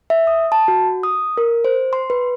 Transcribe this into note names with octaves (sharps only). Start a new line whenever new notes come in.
E5
D#6
A5
F#4
D#6
A#4
C5
C6
B4